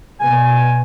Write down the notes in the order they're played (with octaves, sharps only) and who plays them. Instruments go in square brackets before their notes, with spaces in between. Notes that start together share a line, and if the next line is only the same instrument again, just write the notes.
[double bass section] B2 [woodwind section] G#5